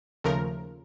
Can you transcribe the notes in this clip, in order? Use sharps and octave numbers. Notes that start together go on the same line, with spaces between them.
D#2 C#3 F3 A3 A#4